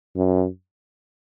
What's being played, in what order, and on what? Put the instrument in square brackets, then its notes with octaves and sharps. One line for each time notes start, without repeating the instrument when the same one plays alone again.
[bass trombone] F#2